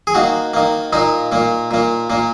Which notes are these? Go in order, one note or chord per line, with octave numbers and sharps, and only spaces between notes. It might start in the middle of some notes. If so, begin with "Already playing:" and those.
G#4
D#3 A#3 F#4
D#3 A#3
A#2 A#3 D#4
A#2 A#3
A#2 A#3
A#2 A#3